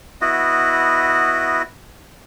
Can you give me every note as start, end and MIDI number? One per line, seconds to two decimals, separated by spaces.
0.21 1.62 59
0.21 1.62 64
0.21 1.62 66
0.21 1.62 75